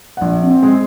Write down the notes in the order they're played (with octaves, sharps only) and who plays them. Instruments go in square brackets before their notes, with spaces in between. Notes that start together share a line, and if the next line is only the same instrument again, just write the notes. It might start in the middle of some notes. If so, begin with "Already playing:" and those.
[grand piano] A#1 F#5
[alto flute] C4
[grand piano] G#3